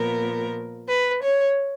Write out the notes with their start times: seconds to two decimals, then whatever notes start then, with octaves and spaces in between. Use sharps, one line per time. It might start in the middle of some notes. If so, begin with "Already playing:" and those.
Already playing: A#2 F3 B3 A#4
0.87 B4
1.21 C#5